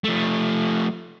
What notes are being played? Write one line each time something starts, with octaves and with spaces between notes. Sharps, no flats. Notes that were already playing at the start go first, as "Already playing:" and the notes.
F3 A3